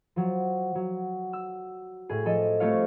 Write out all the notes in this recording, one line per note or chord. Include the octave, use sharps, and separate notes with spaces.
F3 F#3
F#3
E6
A2 G#4
F3 A4 D#5
G3 A3 C4 F4 C#5 F5